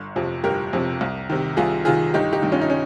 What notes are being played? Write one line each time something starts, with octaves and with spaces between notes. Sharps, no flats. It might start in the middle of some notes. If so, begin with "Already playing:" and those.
Already playing: G1
F2 C3 F3
G1 G4 A#4
F2 C3 F3
C2
C3 D#3
C2 F4 G#4
C3 D#3 F4 G#4
G1 D#4 G4
D#4 G4
G2 D#3
C#4 F4
D#4
C#4